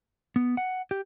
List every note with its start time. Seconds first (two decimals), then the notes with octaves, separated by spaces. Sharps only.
0.36 B3
0.57 F#5
0.91 G4